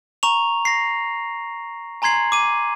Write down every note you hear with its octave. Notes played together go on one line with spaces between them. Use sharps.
A#5 C#6 F7
A#6 C7
G#5 A#5 C6 G#6 C7 F#7
D6 D#7